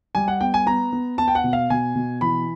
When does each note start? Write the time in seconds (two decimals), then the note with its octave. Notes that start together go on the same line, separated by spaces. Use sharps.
0.15 G3 G#5
0.28 F#5
0.41 B3 G5
0.54 G#5
0.66 B3 A#5
0.92 B3
1.18 B3 A5
1.28 G5
1.35 F#5
1.44 B2
1.53 F5
1.70 B2 G#5
1.95 B2
2.21 E3 B5